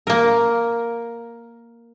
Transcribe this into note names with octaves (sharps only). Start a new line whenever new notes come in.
A#3 A#4